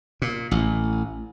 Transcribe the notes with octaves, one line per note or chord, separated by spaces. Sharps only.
A#2
A1